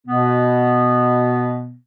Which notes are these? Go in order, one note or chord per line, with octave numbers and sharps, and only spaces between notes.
B2 B3